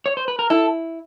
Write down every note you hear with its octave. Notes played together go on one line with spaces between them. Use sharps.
C#5
C5
B4
A#4
E4 A4